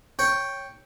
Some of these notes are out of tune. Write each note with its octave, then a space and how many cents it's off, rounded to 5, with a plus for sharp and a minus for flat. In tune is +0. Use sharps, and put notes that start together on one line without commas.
C#5 -5 G5 +0